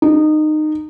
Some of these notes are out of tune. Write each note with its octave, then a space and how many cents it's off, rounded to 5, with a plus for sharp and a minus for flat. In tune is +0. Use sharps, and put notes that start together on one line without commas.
D#4 -20